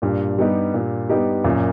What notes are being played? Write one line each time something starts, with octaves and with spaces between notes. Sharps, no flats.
G2 A#2
G3 B3 D#4 G4
A#2
G3 B3 D#4 G4
F#2 A#2